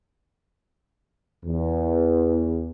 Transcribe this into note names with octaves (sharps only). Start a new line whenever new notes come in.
E2